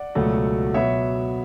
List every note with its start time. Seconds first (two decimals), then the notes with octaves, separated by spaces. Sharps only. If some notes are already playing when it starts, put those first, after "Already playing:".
Already playing: D5 F#5
0.15 C#2 B2 F#3 A3
0.74 B2 F#3 B3 C#5 E5